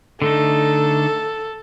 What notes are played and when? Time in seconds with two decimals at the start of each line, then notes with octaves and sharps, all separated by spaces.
0.22 D3 A3 D#4 A4